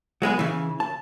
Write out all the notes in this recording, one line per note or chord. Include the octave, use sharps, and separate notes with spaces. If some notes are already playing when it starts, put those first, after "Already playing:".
F#3 G#3 B3 G#4
C#3 E3
A5